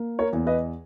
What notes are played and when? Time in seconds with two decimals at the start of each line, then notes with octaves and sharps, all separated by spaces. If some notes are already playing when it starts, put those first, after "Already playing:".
Already playing: A#3
0.19 A#4 C#5
0.33 E2
0.46 B4 D#5